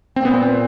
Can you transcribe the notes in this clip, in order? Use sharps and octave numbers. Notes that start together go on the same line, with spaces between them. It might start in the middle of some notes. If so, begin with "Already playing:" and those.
A#2 C4
B3
C4